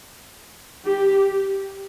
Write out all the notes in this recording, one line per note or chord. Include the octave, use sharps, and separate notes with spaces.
G4